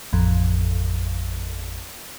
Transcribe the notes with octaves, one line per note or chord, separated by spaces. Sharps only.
A1 F2